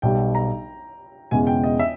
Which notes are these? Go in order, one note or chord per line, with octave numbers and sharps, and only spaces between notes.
B1 B2 G3 G5
A#5
E1 E2 C#3 G#3 G#5
G5
D#5
E5